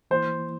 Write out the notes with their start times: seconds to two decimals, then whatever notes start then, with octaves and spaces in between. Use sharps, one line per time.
0.11 E3 A#3 E4 C5